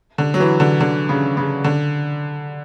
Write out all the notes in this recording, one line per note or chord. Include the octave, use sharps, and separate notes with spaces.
D3
F#3
E3
D3
D3
C#3
C#3
D3